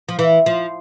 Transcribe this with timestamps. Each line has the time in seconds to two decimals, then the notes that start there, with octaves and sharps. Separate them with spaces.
0.09 F3
0.19 E3
0.46 F3